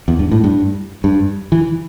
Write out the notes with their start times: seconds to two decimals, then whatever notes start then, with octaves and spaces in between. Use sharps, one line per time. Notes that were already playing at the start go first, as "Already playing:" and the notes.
0.08 E2
0.19 G2
0.31 A2
0.44 G2
1.04 G2
1.52 E3